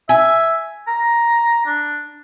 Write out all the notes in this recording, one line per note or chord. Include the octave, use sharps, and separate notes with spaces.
E5 G#5
A#5
D4